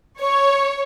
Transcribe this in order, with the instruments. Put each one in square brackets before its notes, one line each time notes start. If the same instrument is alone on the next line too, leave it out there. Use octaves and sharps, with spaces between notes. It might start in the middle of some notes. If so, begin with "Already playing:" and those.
[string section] C#5 [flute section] C#6